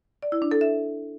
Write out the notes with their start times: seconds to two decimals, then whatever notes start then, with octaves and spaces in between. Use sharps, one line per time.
0.22 D5
0.32 E4
0.42 D4
0.51 A4
0.61 E5